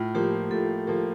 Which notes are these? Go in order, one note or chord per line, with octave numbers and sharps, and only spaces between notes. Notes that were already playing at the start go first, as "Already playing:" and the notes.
Already playing: A2 F4
F3 A#3 G4
A2 A4
F3 A#3